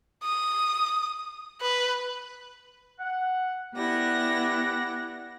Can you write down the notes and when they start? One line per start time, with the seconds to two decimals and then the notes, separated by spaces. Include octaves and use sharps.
0.23 D#6
1.61 B4
3.00 F#5
3.75 B3 E4 G4 D5 F#5 A#6